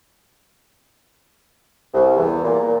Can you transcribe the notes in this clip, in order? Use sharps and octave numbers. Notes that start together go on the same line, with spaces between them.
C2
E2
A#2